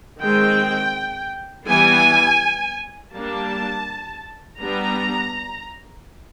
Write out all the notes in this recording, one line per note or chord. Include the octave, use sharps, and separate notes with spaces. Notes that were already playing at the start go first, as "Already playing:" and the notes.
D#3 G#3 C4 G5
E3 G3 B3 G#5
G3 A#3 D4 A5
G3 B3 D4 A#5